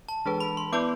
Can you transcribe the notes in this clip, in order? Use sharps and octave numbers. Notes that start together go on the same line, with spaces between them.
A5
E3 G#3 D4 G#4 B4
B5
C6
B3 E4 B4 D5 D6